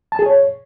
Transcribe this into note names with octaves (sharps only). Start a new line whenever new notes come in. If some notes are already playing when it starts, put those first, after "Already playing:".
A5
G#4
C#5